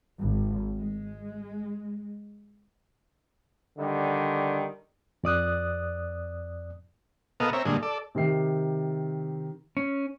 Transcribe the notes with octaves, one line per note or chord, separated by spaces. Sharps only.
G#1
G#3
D3 D#3 G3
F2 D5 D#6 F#6
B2 B3 A4 A#4 D#5 F5
C4 C#5 E5 A#5
G2 A#2 D3 G#3
A4 D5
C3 D#3 G4 C7
C#4